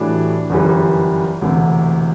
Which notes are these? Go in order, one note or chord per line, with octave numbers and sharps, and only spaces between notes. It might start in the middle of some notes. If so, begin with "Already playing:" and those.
Already playing: A2 E3 G3 D4 F#4
G1 F#2 E3 G3
E1 D2 C3 E3